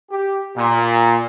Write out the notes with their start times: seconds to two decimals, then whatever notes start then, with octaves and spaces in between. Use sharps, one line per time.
0.11 G4
0.56 A#2